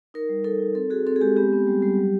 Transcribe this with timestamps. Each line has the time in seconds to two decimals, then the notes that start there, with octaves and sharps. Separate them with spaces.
0.14 D#4 A#4
0.29 G3
0.44 D#4 A4
0.60 D#4
0.75 C4 A4
0.90 F#4 G#4
1.06 C4 A4
1.16 G#4
1.21 G#3 G4
1.36 B3 G4
1.53 B3
1.67 G3
1.83 G3
1.97 F#3